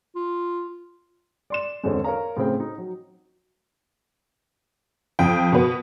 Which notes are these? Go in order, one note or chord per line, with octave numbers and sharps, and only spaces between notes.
F4
D5 C6 E7
E2 G#2 D3 C4 C#4
A#4 C#5 F5 A#5
A2 C#3 C4 G5
D#4
F#3
F2 G5
B2 B3